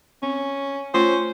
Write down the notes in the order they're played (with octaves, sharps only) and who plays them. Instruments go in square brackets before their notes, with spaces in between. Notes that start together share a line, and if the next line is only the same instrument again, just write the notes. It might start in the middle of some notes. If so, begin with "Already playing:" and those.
[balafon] C4 [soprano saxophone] C#4
[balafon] A3 F4 [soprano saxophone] C#4 [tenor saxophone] C5